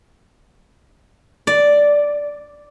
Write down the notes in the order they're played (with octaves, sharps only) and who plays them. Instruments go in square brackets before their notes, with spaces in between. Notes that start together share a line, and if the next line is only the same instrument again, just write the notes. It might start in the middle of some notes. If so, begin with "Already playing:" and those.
[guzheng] D5